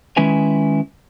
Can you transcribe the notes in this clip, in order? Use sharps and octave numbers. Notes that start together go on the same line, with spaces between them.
D#3 G#3 C#4 E4 B4 G#5